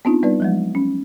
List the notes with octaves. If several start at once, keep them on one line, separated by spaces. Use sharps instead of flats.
B3 C4 D4 D#4 F4
G3 B3 D#4 B4 D5
F3 F#3 G#3
C#4